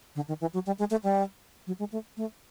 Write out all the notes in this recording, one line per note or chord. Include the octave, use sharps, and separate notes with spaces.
D3
D#3
E3
F#3
G3
G#3
A3
G3
F#3
G#3
A3
A3